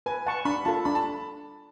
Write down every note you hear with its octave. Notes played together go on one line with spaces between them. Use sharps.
B4 G#5
F#5 A5 C#6
D4 B5
F4 A4 A5
D4 B5
A5